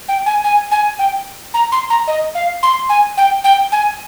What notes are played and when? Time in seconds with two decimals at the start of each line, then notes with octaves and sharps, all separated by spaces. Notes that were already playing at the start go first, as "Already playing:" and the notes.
0.08 G5
0.26 G#5
0.44 G#5
0.71 G#5
0.99 G5
1.54 A#5
1.72 C6
1.90 A#5
2.07 D#5
2.35 F5
2.63 C6
2.89 G#5
3.17 G5
3.44 G5
3.72 G#5